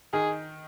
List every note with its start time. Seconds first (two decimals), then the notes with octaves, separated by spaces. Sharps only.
0.13 D#3 D#4 G#4